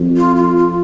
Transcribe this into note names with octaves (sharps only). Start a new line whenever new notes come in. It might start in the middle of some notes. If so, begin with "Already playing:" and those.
Already playing: F2
F4
F4
F4